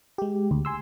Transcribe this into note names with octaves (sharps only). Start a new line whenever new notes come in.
G#3 G4
D2
G#5 C6 E6